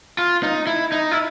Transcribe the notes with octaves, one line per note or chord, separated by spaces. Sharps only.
F4
D#4
E4
D#4
E4